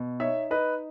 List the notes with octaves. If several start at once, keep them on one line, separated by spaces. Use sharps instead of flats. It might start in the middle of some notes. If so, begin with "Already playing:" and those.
Already playing: B2
D#4 C#5 E5
D#4 B4 D#5